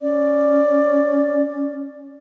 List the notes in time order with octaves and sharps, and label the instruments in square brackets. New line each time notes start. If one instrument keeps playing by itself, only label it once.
[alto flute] C#4 [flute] D5